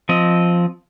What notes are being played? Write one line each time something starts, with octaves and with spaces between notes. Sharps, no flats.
F3 C4 D#5